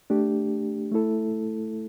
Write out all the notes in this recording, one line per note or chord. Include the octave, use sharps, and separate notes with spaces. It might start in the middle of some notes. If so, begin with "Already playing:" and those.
A3 D4 G4
A3 E4 A4